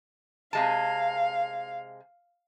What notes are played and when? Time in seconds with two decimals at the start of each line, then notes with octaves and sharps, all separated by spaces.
0.53 C3 G#3 F5 A5